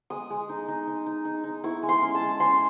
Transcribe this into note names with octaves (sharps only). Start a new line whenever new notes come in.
G#3 D#6
G#3
D#4
D#4
D#4
D#4
D#4
D#4
E4 C#6
G#3
C6
C#4
A5
G#3
C#4 C6